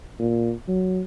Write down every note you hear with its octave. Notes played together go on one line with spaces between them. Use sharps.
A#2
F#3